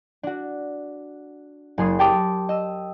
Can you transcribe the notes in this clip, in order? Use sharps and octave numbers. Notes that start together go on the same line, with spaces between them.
D4 F#4
F#1 G#4 C6 D#6
G4 G5 A5 D6 D#6
D#5 E6